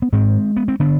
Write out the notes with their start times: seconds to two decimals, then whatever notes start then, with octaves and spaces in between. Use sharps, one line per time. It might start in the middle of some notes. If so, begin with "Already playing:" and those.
0.02 B3
0.12 G#2 G#3 C4
0.56 B3
0.68 C4
0.80 D3 B3 D4